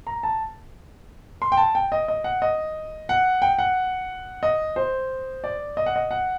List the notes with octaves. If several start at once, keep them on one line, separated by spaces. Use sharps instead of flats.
A#5
A5
C6
G5
A5
G5
D#5
D#5
F#5
D#5
F#5
G5
F#5
D#5
C5
D5
D#5
F#5
D#5
F#5